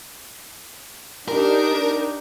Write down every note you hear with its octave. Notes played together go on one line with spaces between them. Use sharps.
D4 D#4 G4 A#4